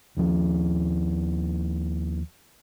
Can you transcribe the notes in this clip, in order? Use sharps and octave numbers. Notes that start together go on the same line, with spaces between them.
D#2 F3